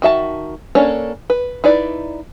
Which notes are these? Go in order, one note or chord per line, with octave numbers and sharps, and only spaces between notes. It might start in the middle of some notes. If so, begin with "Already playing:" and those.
D#3 F#4 E5 A5
A#3 C#4 D4 A4 C#5
B4
D#4 E4 B4 D5